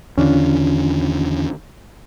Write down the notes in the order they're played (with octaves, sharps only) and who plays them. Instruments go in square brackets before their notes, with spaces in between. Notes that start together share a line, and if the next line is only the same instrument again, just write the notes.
[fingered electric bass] E2 D3 D#3 [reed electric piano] C#4 D4 F4